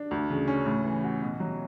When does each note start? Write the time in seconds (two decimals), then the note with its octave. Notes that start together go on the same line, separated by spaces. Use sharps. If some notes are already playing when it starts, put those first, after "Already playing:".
Already playing: D4
0.11 D2
0.30 C#3
0.47 C#4
0.66 A2
0.84 E3
1.03 F#4
1.22 B2
1.40 F#3